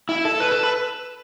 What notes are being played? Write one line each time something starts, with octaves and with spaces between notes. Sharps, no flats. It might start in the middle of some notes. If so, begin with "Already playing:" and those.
E4
A4
B4
A4
B4